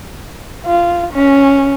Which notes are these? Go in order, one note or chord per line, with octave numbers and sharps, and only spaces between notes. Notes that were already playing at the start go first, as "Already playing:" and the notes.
F4
C#4